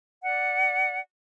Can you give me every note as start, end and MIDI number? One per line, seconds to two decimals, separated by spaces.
0.24 1.00 74
0.24 1.00 78